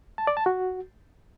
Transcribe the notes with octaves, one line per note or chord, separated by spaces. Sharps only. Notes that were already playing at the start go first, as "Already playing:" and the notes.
A5
D5
A5
F#4